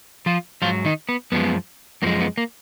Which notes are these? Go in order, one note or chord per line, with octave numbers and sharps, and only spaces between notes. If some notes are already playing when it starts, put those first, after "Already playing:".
F3 F4
G#2 F3 F#3 F4
D#3 D#4
B3
F#2 F3 G#3 B3
F#2 F3 G#3 A#3
B3
A#3